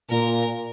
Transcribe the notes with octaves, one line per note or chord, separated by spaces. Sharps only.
A#2 A#4